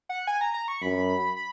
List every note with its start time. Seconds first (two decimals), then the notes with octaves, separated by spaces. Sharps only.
0.09 F#5
0.27 G#5
0.41 A#5
0.54 A#5
0.68 C#6
0.82 F#2 B5
1.37 B5